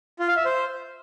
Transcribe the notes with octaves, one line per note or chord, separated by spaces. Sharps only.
F4
F5
E5
C5